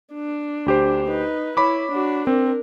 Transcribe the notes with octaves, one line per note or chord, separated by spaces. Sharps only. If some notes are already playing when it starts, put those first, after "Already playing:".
D4
D2 G4 C5
D#4 B4
E4 C#5 B5 D6
D4 F#4
C4 D4 A#4